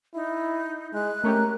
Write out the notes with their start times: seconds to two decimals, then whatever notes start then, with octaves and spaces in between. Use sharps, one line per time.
0.15 D#4 E4
0.93 G#3 F#6
1.24 A3 C#4 G4 A#4